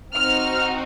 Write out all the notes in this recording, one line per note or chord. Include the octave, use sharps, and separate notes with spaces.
C4 D#4 F#4 F6